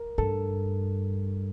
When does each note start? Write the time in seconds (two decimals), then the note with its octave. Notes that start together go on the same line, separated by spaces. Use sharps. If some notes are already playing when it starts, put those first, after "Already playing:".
Already playing: A#4
0.18 G2 A4